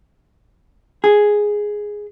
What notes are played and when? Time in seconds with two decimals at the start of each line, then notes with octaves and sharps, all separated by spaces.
1.04 G#4